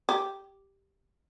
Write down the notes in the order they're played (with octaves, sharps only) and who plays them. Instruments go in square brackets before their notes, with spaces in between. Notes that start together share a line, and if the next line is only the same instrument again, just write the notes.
[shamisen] G4